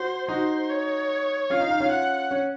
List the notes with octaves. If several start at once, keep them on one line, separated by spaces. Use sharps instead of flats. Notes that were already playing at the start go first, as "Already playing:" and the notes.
Already playing: F#4 C5
D#4 F#4 C5
C#5
C#4 F4 F5
D#4
D#4
C#4 F4
F#5
C#4